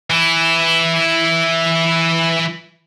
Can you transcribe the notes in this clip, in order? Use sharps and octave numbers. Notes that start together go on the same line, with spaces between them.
E3 E4